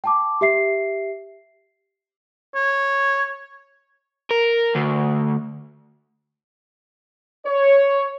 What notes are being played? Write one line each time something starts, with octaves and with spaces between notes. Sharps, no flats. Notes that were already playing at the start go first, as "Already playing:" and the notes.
G5 A5 D6
G4 E5 C7
C#5
A#4
D2
C#5